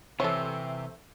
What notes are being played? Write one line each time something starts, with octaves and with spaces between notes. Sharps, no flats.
C3 E3 A3 C4 A4 C#5